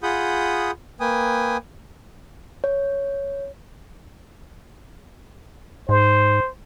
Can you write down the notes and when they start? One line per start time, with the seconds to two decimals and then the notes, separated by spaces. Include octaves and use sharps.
0.03 F4 G#4 F#5 B5 D#6 G6
1.00 A#3 B4 G5 G#5 D#6
2.64 C#5
5.89 G#2 C5